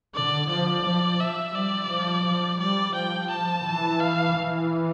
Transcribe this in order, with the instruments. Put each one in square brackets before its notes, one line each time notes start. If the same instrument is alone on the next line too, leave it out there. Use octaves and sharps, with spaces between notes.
[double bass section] D3 [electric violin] D5
[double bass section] F3 [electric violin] D5
[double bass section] F3
[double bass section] F3 [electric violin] E5
[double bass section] G3 [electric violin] D5
[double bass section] F3
F3
[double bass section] G3 [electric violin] D5
[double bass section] F3 [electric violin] G5
[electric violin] A5
[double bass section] E3
[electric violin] F5
[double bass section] E3